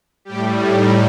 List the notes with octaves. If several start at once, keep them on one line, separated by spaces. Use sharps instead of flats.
A2 G3 G4
D#4